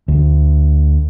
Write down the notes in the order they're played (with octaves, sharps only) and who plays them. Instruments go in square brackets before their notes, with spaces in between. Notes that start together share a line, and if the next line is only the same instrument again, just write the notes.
[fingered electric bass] D2